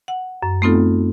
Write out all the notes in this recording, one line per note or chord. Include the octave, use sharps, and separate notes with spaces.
F#5
F#2
A3 B3 C4 D#4 F4 A4